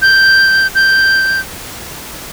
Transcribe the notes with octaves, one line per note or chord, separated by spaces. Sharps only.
G6
G6